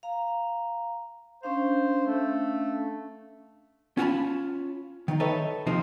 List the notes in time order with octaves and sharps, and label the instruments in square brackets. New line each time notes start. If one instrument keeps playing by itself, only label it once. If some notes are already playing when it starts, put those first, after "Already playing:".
[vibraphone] F5 A#5
[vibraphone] C#4 D4 F5 [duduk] C5
[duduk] A3
[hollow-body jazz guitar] C#4 F4 F#5 G#5 A5 B5
D#3 D#4
A4 B4 C#5 D#5 E5
D#2 C3 F3 C4 D#4